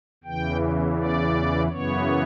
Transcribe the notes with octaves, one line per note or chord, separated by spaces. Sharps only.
E2 C#3 E3 G5
D5
F#2 C#3 E3 B3 C#5